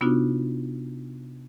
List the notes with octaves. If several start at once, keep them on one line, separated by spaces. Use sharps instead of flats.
C3 B3 D4 D#4 F4 F#4